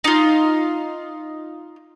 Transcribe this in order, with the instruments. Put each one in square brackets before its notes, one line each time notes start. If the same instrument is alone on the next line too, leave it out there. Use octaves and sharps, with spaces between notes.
[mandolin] D#4 F4